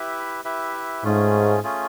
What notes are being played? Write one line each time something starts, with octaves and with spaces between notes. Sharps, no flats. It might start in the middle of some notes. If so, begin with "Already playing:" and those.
Already playing: E4 G4 B4 E5
E4 G4 B4 E5
G#2 A3 C#4 F4 G#4
A3 C#4 F4 G#4